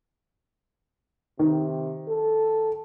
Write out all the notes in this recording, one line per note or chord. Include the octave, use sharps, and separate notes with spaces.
C3 D#3
A4